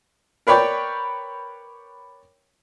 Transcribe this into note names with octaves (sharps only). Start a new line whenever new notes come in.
A#4 B4 C#5 D5 G5